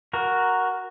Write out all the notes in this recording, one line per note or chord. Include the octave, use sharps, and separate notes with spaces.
F#4 A#4